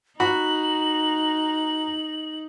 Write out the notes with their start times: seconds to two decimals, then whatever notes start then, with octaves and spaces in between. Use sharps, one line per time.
0.20 D#4 F#4 A#5 B5 F#7